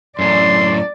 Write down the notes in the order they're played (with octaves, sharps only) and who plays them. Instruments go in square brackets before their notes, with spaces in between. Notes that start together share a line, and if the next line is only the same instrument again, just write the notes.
[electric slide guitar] F#2 A2 [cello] D5 [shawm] C6